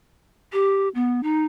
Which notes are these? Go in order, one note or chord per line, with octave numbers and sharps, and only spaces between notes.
G4
B3
D#4